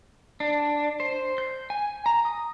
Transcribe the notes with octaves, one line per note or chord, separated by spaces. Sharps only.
D4
C5
G6
G#5
A#5
D#6